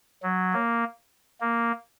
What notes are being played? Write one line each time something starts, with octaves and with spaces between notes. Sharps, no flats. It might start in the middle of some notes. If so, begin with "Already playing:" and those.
F#3
A#3
A#3